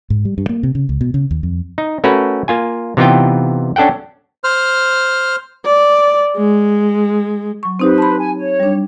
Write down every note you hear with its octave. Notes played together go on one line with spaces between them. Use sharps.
G#2
G3
G2
A#3
C3
C#3
C#2
B2
C#3
D#2
F2
D#4
A3 C#4 F#4 A#4 B4
A#3 F4 G#5
C3 E3 B3 D#4 F4 G5
C#4 D4 A4 F#5 G5
C5 F6
D5
G#3
F#3 C#6
C4 D#4 G4 B4 C5
A5 B5
G#5
C#5
G3 D4